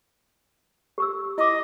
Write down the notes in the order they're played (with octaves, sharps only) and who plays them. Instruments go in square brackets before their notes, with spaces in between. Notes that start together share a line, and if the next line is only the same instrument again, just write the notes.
[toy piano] G4 C#6 E6
[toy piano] E4 D6 [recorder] D#5